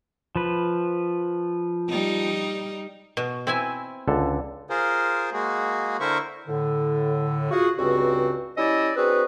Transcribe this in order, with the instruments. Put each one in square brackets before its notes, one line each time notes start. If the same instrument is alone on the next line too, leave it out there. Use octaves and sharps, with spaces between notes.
[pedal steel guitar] F3 B4
[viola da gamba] G3 D#4
[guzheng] B2
C4 E4 G#5
[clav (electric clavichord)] C#2 D3 A4
[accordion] F4 G#4 A#4 C5
G#3 A#3 F#4 G#4
D3 E4 A#4 C5 E5 C#6
[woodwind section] A2 D3
F4 F#4 G#4
C#2 G2 C#3 C4 F#4
G3 C#4 E4 D5 D#5 E6
C4 D4 F#4 G#4 B4